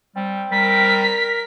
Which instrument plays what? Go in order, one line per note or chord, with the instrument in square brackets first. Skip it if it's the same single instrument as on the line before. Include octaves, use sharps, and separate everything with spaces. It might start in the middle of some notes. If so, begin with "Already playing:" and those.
[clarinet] G3 [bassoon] C4
[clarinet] G3 [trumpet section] A#4 [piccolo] B6